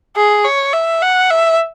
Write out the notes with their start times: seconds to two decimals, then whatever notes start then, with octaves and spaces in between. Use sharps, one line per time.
0.16 G#4
0.45 C#5
0.73 E5
1.02 F#5
1.30 E5